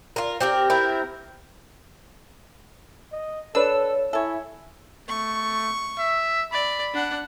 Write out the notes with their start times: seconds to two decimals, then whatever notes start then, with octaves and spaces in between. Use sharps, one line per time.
0.16 F4 A#4
0.41 C4 G4 A#4
0.70 C4 E4 A#4
3.12 D#5
3.55 D4 A4 B4 C#5 E6
4.13 E4 A4 C#5 E5 G#5
5.08 A3 C#6
5.98 E5
6.53 D5 B5
6.94 D4 F#5